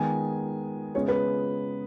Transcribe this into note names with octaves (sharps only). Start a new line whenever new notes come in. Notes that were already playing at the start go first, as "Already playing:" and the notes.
Already playing: D#3 G#3 B3 G#5
C#3 G#3 B3 C#5
B4